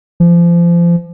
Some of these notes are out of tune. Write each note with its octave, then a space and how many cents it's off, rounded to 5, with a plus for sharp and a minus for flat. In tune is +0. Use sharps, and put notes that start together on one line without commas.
F3 -30